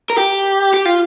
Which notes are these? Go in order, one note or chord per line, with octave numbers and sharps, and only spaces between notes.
A#4
G4
G4
F4